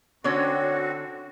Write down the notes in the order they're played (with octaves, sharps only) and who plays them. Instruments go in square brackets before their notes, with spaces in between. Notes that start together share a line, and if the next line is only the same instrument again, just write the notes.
[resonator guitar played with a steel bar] D3 C#4 C#5 [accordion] C4 F#4